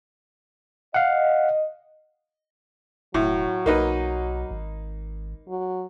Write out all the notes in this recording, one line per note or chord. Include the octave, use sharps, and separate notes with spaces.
D#5 F5 F#5
E1 A2 F#3
B1 A#3 D#4 B4
G#1
F#3